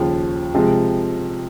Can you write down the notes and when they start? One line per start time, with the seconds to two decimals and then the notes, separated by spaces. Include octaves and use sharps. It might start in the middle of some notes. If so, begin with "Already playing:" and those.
Already playing: D#2 C#3 F3
0.54 C3 F3 G#3